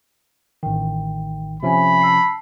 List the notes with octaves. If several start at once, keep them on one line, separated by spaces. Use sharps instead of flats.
A1 D#3 G5
C3 F3 C#4 E5 G#5 B5
A5 E6 C7